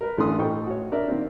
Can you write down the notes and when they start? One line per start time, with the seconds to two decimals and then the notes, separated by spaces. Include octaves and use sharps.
0.01 A#4 B4
0.18 A1 E3 D4 A4 C6 D#6
0.38 A2 D#4 A4 C5 G5 C#6
0.67 F#4 C#5
0.92 D4 A#4 D5 E5
1.08 D#3 A#3 C4